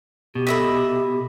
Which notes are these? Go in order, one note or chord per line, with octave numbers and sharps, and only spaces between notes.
B2 G4
A4 D#5 E5 B5 B6